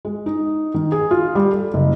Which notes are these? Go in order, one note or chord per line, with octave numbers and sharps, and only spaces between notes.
G#3
D#4
D#3
G#4
F4
G3
A4
F#1